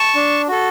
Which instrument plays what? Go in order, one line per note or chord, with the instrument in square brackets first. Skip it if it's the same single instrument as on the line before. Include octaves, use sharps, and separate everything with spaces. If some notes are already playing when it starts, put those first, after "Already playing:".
Already playing: [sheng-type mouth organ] A5 C#6
D4
F#4 A4